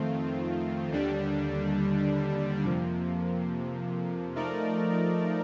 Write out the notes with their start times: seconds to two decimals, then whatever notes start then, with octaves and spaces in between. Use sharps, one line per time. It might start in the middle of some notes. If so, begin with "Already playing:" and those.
Already playing: F2 D#3 A3 C4 F4
0.90 D#2 D3 G3 D4
2.63 F2 C3 F3 A#3
4.36 F3 A3 D#4 A#4 D5